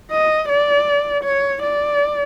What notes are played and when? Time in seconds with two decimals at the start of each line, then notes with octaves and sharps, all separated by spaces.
0.11 D#5
0.49 D5
1.24 C#5
1.63 D5